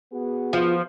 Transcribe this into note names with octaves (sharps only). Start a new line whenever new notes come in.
B3 F#4 G#4
F3 F4